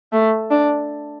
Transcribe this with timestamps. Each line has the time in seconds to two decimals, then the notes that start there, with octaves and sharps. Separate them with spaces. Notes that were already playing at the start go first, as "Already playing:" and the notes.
0.13 A3
0.51 D4